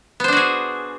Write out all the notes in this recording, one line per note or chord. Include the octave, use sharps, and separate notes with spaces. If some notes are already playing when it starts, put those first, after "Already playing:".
B3 D4 F#4 G#4 C5